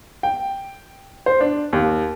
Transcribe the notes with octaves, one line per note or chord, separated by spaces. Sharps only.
G5
C5
D4
D#2